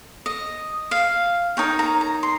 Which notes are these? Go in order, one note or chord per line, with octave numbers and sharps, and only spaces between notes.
D#5
F5
D#4 A#4 C#5 G5
A#5
A#5
C6